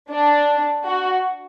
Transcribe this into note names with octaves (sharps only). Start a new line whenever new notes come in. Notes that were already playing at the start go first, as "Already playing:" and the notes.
D4
F#4